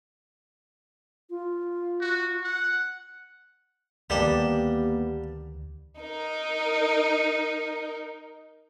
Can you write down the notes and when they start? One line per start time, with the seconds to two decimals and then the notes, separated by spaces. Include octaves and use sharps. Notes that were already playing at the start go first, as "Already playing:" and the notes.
1.30 F4
2.01 F#4
2.44 F#5
4.10 D2 D#3 G3 A#3 B3 D4 G4 A#4
6.01 D#4 A#4